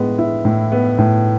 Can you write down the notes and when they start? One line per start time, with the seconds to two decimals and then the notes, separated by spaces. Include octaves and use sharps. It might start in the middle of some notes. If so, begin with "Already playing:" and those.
Already playing: A2 G#3 B3
0.19 E4
0.45 A2
0.72 B3
0.98 A2